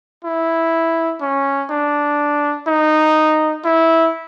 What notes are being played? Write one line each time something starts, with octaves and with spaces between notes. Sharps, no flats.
E4
C#4
D4
D#4
E4